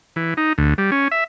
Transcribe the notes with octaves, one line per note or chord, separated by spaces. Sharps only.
E3
D#4
D2
G3
C#4
E5